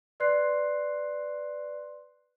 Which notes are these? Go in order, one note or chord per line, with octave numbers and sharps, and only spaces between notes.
B4 D5 C6 F#6 C7